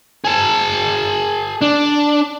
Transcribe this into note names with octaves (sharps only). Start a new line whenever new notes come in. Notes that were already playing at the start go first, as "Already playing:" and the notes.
G#4 A5
D4